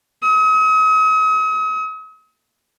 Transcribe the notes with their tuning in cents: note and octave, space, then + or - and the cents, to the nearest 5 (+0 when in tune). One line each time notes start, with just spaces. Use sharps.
D#6 +40